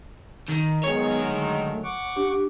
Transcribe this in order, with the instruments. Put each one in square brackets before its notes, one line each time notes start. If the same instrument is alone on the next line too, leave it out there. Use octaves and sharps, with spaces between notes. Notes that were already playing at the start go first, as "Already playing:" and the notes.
[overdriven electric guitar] D#3
[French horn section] D#3 F#3 G#3 [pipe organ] B3 G#4 [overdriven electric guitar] C#5
[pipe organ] D3 A3
F#5 C#6 D6
[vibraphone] D4 G4